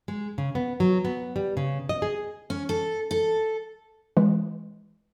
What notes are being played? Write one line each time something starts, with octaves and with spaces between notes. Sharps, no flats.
G#3
C#3
B3
F#3
B3
G3
C#3
D#5
G#4
C#4
A4
A4
E3 G#3